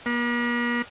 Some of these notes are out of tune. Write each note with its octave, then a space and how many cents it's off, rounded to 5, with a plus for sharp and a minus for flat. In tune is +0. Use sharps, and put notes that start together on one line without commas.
A#3 +45